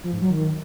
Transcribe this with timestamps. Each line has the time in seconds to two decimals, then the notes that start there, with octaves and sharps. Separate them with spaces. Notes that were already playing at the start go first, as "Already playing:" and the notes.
0.04 F3
0.12 G#2
0.21 F#3
0.29 D#3